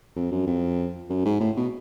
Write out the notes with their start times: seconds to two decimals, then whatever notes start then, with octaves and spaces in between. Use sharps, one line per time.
0.16 F2
0.32 F#2
0.46 F2
1.10 F#2
1.25 G#2
1.40 A2
1.57 B2